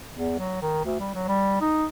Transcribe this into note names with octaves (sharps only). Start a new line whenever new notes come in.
E2
F#3
D#3
D2
G3
F#3
G3
D#4